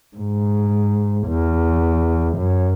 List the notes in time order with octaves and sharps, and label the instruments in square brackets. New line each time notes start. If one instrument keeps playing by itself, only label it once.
[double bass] G#2
E2
F#2